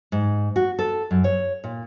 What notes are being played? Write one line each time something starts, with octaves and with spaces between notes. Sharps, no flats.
G#2
F#4
A4
F#2
C#5
A#2